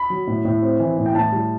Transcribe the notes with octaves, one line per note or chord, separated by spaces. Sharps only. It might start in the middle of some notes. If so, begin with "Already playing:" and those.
Already playing: B5
F#3
A2
A2
C4
E3
A2
G5
A2 A5
G3